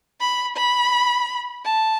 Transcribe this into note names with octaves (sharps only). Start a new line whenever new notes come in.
B5
B5
A5